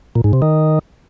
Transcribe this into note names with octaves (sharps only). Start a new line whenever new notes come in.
A#2
G#2
C3
D#3